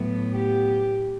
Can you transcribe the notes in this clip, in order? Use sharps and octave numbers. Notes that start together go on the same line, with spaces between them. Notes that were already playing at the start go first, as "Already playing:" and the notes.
Already playing: A2 F#3 B3
G4